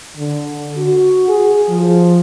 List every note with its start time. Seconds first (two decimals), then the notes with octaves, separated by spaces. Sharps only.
0.17 D3
0.77 F#4
1.29 G#4
1.68 F3